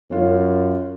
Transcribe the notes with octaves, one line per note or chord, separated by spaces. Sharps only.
F#2 C#4 F4